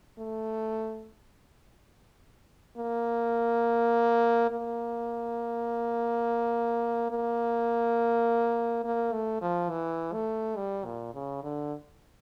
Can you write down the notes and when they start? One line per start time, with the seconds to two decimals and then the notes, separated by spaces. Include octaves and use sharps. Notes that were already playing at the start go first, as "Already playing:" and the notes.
0.19 A3
2.78 A#3
4.51 A#3
7.11 A#3
8.84 A#3
9.13 A3
9.42 F3
9.70 E3
10.13 A3
10.57 G3
10.85 A#2
11.14 C#3
11.43 D3